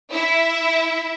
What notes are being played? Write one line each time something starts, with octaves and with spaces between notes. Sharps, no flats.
E4 E5